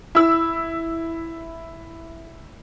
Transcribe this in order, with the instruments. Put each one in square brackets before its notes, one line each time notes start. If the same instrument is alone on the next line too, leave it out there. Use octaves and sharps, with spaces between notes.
[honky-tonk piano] E4 E6